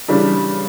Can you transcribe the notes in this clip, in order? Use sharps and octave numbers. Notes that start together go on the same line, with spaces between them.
C#3 E3 G3 D4